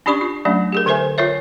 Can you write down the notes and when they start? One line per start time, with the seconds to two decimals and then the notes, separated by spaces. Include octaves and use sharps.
0.06 C#4 D4 G4 D5 B5 C#6
0.21 F4
0.45 F#3 A3 C#4 D4 E5
0.72 G4 G#4 A#4
0.86 D3 A4 A#4 C5 E5 G#5
1.18 F4 A#4 C#5 E5